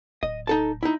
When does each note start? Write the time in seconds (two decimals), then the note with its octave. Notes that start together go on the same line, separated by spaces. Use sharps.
0.23 D1 D#5
0.47 D#4 A4 A5
0.83 D#4 E4